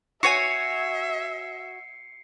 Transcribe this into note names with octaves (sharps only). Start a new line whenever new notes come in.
F#4 C#5 E5 G#5 C7 C#7